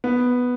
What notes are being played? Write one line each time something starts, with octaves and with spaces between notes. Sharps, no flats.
B3